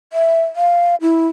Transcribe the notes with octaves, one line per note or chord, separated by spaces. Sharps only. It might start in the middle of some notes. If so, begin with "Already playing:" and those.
E5
F5
E4